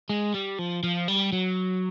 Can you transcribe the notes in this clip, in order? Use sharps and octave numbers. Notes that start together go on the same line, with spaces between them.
G#3
G3
F3
F3
G3
F#3